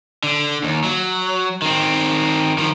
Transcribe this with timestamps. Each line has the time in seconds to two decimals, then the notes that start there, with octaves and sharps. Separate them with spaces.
0.23 D3
0.64 D#2
0.84 F#3
1.62 D#3 C4
2.58 D#3 F3